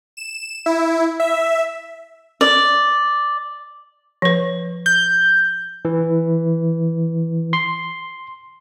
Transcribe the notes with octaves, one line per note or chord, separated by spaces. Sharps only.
E7
E4
E5
D5
F3 B4
G6
E3
C6